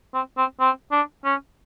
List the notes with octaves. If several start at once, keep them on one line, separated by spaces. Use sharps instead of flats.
C4
C4
C4
D4
C#4